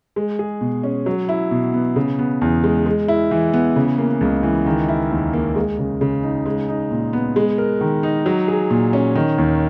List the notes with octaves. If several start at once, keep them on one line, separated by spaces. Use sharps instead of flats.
G#3
G#4
B2
C#4
F#3
E4
B2
B3
C#3
B3
E2
G#3
G#3
E4
E3
B3
C#3
A#3
C#2
E3
D#3
E4
D#2
A#3
G#3
C#3
C#3
D#4
G#3
D#4
A#2
B3
G#3
A#4
D#3
D#4
F#3
G#4
A#2
C#4
D#3
D#2